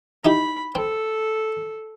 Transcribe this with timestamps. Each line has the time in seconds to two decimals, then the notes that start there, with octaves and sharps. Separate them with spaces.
0.25 D#4 E4 G4 B5
0.75 C4 A4